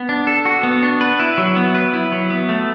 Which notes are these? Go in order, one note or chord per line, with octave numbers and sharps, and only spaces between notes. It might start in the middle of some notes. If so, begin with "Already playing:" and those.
Already playing: B3
D4
A4
F#4
B3
D4
B4
E4
F#3
B3
B4
E4
F#3
B3
A3